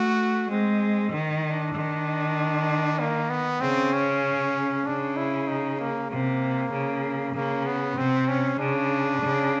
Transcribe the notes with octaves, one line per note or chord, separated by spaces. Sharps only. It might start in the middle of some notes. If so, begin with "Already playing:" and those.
Already playing: A3 F#4
G#3 C4
D#3
D4
D#3
A#3
B3
C#3 C4
C#4
C#3 D4
E4
D#4
A#3
C3 A#3
C#3
C#3 A#3
B3
C3 C4
C#4
C#3 D4
C#3